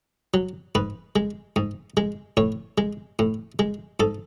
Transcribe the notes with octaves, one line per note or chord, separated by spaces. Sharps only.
F#3
G#2 B4
G#3
G#2
G#3
A2 C#5
G#3
A2
G#3
G#2 A4